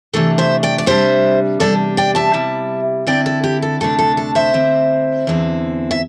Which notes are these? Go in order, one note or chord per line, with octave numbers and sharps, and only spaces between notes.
C3 E3 A3 D4 A4
C5 E5
D5 G5
D5
C3 G3 D4 C5 E5
E2 C3 G3 D4 A4 D5
D5 G5
E5 A5
C3 G3 E4
D2 D3 C4 E4 D5 G5
A4
G4
A4
D2 C3 A3 D4 A4
A4
A4
C5 E5
D3 C4 E4
E2 D3 C4 E4
E5